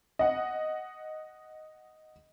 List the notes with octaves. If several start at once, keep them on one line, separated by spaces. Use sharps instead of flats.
D#5 F#5